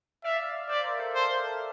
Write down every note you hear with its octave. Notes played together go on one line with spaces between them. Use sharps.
D5 E5 F5
C5 D5 E5
A#4 D5
A4 C5
C5